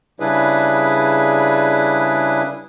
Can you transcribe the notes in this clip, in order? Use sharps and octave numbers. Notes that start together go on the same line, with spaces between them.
C#3 G3 D4 E4 G#4 B4